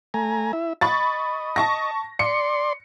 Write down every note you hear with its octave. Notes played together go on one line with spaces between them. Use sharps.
A3 G#5 A#5
E4 E5
D#5 B5 C#6 A6
A5 C#6 A#6
D5 C6 C#7